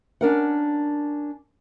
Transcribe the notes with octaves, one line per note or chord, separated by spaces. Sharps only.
C#4 D4 A#4 F#5